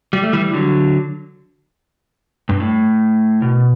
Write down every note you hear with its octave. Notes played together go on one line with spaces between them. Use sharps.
G3
A3
E3 G3
D3 F#3
G2
A2
B2